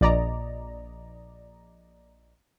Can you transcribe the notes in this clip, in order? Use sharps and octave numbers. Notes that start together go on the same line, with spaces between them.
A#1 D5 D#5 A#5